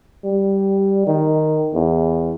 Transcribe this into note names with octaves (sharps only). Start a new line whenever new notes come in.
G3
D#3
E2